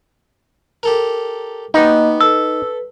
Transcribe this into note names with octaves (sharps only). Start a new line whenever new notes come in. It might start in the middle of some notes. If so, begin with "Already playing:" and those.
G4 A4 A#4
A#3 B3 D#4 F#4 G4 D#5
A4 B4 E6